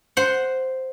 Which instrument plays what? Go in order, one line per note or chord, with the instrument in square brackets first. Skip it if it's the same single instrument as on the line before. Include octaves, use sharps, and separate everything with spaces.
[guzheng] C5 F#5